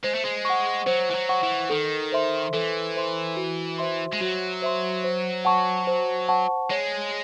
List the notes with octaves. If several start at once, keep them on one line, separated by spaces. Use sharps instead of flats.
G#3 C5
A3
G#3
F#5 C#6
F#3 C5
E3
F#3
F#5 C#6
E3
D#3 A4
C5 E5 C6
E3 A4
C5 E5 C6
F#4
C5 E5 C6
G#3
F#3 F#4
C5 E5 C6
C5
F#5 A5 C#6
C5
F#5 A5 C#6
G#3 C#5